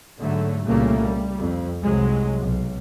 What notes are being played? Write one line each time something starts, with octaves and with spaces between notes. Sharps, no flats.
G#2 D3 F#3 A3
C2 A#2 C#3 G3 A3 A#3
G3
F2
C2 F#3 G#3
B1